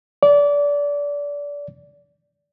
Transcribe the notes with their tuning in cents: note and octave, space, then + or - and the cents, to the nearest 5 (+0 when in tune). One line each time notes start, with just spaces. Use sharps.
D5 -25